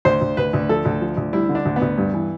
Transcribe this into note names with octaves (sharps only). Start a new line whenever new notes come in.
D2 C5
D2
D2 B4
D2
F3 A4
D2
F3
D2
G3 E4
D3
D4
D2
B3
D2
G2
E3